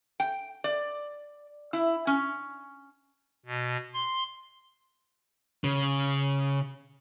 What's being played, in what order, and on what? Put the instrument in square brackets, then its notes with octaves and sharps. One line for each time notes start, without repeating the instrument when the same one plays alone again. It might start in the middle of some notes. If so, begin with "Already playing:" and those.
[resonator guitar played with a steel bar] G5
D5
E4
C#4
[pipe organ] B2
C6
[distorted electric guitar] C#3